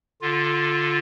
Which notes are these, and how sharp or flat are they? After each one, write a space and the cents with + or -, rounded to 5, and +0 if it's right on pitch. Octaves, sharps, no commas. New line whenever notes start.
D3 +0 F4 +5